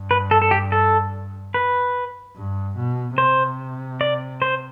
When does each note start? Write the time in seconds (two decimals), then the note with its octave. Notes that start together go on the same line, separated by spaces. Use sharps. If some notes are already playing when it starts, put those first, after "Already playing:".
Already playing: G2
0.11 B4
0.31 A4
0.42 A4
0.51 G4
0.72 A4
1.54 B4
2.36 G2
2.77 B2
3.18 C3 C5
4.01 D5
4.42 C5